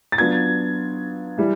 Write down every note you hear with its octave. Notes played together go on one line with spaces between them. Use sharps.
A6
F#3 B3 D4 F4 G#6
E3 G3